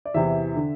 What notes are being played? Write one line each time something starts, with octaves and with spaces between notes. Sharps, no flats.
D5
E2 C3 E3 E5
D3